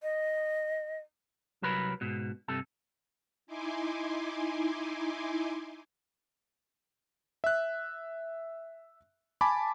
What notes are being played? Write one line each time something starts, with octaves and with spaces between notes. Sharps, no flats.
D#5
C2 F#3 A#4 B4 B5
G#2 B2
G2 C3 A4
D#4 E4 G#5 C6 D6
E5 F#6
G#5 A5 B5 D6